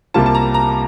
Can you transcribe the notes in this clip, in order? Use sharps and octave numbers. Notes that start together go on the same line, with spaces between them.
C2 C3 G3 A#3 F4 A5
A5
A#5
A#5